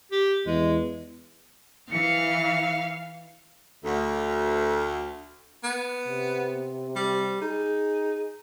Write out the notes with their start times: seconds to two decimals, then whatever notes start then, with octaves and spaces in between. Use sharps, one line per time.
0.12 G4
0.46 E2 G#3
1.91 E3 F5 C#7
3.83 D2
5.64 B3
6.08 C3
6.96 G3
7.42 D#4 G#4